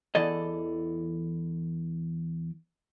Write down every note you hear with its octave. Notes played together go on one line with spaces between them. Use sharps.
E2 E3 A4 D5 D#5